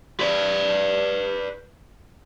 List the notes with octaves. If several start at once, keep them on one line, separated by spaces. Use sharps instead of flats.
B4 D5